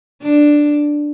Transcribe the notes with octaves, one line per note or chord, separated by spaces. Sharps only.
D4